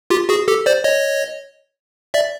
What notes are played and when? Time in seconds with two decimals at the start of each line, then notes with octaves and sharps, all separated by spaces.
0.10 F4 G4
0.29 F#4 G#4
0.48 G4 A4
0.66 C5 D5
0.84 C#5 D#5
2.14 D5 E5